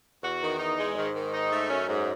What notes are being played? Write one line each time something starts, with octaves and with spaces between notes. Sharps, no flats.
E2 F#4
D#3
D#4
G#3
G#2 D#3
D#3
D#4
A3
F#2 C#4
G#2